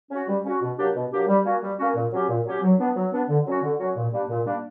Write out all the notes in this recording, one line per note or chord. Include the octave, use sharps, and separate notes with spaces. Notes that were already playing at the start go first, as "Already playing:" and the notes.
C#4 F#4
G3
C#4 F#4
B2
F#3 A#3 D4 G4
B2
F#3 A#3 D4 G4
G3
A#3 C#4 F#4
G3
A#3 C#4 F#4
A#2
F#3 C#4 G4
A#2
F#3 C#4 G4
F#3
B3 D4
F#3
B3 D4
D3
F#3 C#4 F#4
D3
F#3 C#4 F#4
A#2
G3 A#3 D4
A#2
G3 A#3 D4